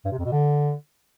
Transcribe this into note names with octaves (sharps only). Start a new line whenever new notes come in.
G2
C3
F2
B2
D3